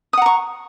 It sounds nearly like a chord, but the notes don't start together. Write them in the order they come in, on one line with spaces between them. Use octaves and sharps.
D#6 F#5 A#5 C#6